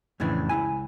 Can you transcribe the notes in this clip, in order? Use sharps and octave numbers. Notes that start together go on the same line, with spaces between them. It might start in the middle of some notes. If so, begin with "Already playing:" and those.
F2 A2 C#3 E3 D4
C#2 E3 E4 G#5